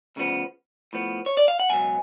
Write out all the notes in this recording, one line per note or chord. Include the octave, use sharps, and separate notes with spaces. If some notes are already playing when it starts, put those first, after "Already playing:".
D2 C#3 F3 B3
A2 F3 B3
C#5
D5
F5
F#5
C#2 B2 F#3 B3 G#5